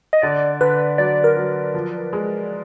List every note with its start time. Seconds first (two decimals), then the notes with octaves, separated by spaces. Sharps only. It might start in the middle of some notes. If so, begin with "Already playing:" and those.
0.13 D#5
0.22 D3 D5
0.61 D3 B4
0.98 F#3 D5
1.24 A#4
1.37 F#3
1.74 F3
2.13 G#3